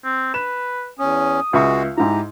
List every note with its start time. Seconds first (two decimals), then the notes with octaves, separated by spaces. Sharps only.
0.04 C4
0.34 B4 E7
0.99 E2 C#4 D#6
1.53 C#2 G#3 F#4 E5 C#6
1.97 G#2 E4 G4 A#5